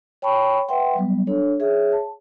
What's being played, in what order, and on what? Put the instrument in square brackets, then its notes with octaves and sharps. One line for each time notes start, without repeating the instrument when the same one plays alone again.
[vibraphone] C#5 G5 A5 B5 C#6
B4 E5 F#5 G5 C6
F#3 G3 B3
D4 A4 C#5
G#4 C#5 E5
A5